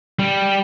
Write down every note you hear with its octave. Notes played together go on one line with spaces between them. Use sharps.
G3